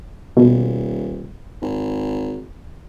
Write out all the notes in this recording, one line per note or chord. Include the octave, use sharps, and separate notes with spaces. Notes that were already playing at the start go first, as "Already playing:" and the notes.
D#1 B2
G#1